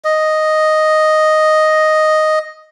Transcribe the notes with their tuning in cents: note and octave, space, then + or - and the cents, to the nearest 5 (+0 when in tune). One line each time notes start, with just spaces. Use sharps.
D#5 +0